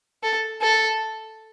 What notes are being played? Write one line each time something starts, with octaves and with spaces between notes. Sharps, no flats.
A4
A4